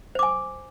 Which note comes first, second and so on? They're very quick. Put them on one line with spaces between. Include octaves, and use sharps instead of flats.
C5 D6 G#5